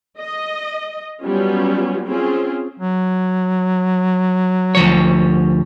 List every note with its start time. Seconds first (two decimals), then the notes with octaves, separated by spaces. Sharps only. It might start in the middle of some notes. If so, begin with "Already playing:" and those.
0.19 D#5
1.22 F#3 G3 B3 C#4 F4
2.07 C4 C#4 F4 G#4
2.78 F#3
4.75 D2 F3 C#5